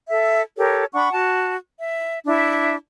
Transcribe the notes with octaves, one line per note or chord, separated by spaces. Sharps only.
A4 E5
G4 A4 A#4 C#5
D4 F#5 B5 C#6
F#4 A5
E5
D4 E4 E5